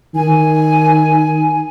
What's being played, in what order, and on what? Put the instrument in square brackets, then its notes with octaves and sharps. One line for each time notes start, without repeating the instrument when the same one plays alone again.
[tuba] D#3 [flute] G#5